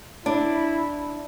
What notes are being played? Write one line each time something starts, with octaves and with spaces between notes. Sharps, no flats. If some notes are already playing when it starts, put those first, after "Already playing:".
D4 E4